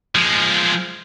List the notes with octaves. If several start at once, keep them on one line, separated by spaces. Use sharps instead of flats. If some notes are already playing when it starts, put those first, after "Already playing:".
F3 G#3